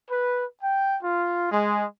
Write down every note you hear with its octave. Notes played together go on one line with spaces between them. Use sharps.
B4
G5
F4
G#3